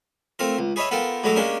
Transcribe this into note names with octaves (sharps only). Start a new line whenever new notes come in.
A3 C4 F4 A#4
C#2
G#4 B4 C#5 D#5 E5
B3 F4 A4 A#4 G5
A2 F#3 G#3 A3 A#5 D6
G#3 A#3 C#4 D4 G4 A#4